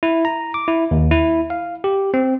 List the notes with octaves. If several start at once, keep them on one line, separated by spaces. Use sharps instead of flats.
E4
A#5
D6
E4
D#2
E4
F5
G4
C4